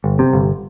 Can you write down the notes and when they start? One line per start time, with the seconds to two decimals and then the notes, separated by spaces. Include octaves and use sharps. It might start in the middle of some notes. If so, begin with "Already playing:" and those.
0.04 G1
0.19 C3
0.33 G1